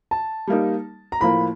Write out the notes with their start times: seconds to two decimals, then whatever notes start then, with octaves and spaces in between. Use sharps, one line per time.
0.11 A5
0.47 G3 A#3 D#4
1.12 A#5
1.20 A2 F3 A#3 B5